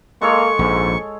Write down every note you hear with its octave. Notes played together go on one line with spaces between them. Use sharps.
G#3 A#3 A4 C#5 C#6
A#1 G#2